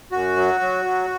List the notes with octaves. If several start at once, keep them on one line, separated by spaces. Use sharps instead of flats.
F#2 F#4
F#3
F#3
F#3